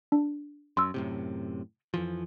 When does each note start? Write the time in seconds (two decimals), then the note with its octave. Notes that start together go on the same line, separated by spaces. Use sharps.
0.12 D4
0.77 F#2 C6 E6
0.94 F#2 A2 C3
1.94 F2 E3 F3